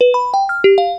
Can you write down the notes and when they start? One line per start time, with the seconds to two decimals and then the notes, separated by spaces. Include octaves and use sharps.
0.01 B4
0.14 B5
0.34 G5
0.49 F6
0.64 G4
0.78 F5